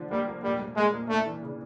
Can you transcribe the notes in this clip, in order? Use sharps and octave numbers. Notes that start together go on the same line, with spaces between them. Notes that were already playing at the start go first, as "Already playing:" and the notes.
Already playing: D3 F3 D4
G3 A#3
F3
A#2 G3
G3
G#3 A#3
A#2
A3 D4
E3
C#3